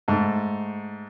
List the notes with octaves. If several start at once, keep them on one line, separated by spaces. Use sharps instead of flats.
G#2 A3